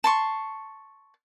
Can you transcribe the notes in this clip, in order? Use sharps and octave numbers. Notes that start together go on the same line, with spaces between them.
A5 C6 C#6